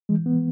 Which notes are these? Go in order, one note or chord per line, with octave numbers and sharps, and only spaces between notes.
E3 G#3
B3
E3